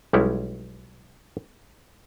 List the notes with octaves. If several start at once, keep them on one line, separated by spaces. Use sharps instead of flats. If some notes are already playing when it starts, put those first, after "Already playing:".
B1 G3 G#3 C#4 E4